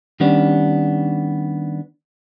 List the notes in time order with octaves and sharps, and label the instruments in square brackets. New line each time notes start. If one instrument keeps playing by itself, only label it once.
[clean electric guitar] D#3 G3 B3 C#4 D4